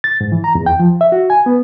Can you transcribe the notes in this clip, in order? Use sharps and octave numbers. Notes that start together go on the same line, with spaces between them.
A6
G#2
E3
A#5
E2
G5
F3
E5
F#4
G#5
B3